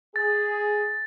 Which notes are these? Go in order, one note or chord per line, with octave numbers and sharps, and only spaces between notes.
G#4 A6